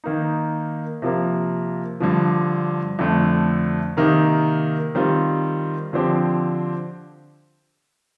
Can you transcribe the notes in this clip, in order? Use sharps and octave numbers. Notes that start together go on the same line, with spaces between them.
D#3 A#3 D#4
C3 F3 A#3
G2 D3 F3
F2 D3 A3
C3 D#3 A#3 D#4
D#3 G3 C4 F4
D3 F3 C4 G4